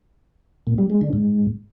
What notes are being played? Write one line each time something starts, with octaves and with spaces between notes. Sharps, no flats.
A#2
G3
G#3
D3
G#2